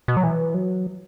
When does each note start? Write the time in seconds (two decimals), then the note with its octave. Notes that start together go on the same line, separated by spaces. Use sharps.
0.08 B2
0.17 F#3
0.23 E3
0.54 F#3